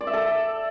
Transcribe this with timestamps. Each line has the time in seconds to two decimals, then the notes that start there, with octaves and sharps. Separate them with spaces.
0.01 D5
0.07 E5
0.13 A4